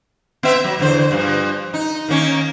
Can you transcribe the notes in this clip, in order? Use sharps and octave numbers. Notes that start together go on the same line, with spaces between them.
B3 E5
F#3
E2 D3 C5
G2 F3
D#4
D#3 A#3 C#4